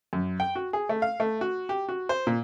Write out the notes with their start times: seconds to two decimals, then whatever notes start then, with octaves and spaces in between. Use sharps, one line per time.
0.13 F#2
0.40 G5
0.55 F#4
0.73 G#4
0.89 A3
1.02 F5
1.20 A3
1.41 F#4
1.69 G4
1.89 F#4
2.09 C5
2.27 A#2